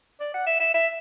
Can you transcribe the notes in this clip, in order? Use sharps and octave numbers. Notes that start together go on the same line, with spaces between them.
D5
F#5
E5
E5
E5